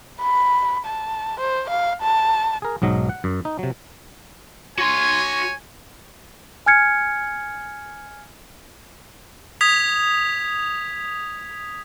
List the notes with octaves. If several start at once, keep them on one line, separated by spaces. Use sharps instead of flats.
B5
A5
C5
F5
A5
G#4 A#4
B1 G#2 F#3 D#5
F#5
F#2
D#4
C3 F#3
F#4 C#5 G#5 C6
G#5 F6 G#6 C#7
D#6 G#6 B6 F7